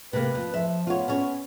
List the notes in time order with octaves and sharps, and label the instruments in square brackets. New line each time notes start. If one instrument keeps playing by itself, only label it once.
[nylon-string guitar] C3 A#3 [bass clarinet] B4
[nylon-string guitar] F2
[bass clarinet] F3 [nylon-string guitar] E5
[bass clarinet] B3 [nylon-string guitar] F4 C#5
[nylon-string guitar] C#4 C#5